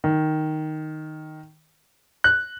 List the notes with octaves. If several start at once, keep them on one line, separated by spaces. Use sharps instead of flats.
D#3
F#6